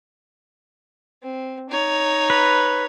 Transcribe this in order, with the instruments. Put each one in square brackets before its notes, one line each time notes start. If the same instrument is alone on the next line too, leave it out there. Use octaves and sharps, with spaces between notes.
[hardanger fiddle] C4
D#4 C#5
[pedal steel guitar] B4